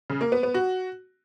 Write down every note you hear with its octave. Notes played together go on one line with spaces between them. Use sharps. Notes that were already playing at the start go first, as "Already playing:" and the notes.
C#3
A#3
B3
B3
F#4